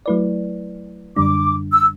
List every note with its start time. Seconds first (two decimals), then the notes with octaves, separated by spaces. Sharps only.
0.06 F#3 A3 E4 B4 D5
1.16 F#2 D3 G3 D4 D6
1.72 E6